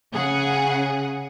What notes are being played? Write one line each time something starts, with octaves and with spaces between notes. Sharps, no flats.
C#3 G#4 F#5